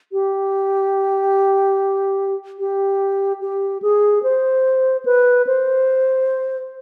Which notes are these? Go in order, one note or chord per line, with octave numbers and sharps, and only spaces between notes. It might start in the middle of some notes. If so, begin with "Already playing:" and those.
G4
G4
G4
G#4
C5
B4
C5